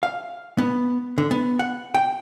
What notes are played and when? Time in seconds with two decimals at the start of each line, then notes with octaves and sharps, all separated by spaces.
0.03 F5
0.58 B3
1.18 D3
1.31 B3
1.59 F#5
1.94 G5